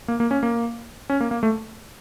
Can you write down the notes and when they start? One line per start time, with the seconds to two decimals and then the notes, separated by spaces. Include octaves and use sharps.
0.08 A#3
0.20 A#3
0.31 C#4
0.43 A#3
1.10 C#4
1.21 A#3
1.31 A#3
1.43 A3